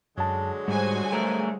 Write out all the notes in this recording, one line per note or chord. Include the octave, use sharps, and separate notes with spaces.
F#2 D3 F#3 G#3 A5
G#2 G3 F#4 C5 G#5
A3 A#4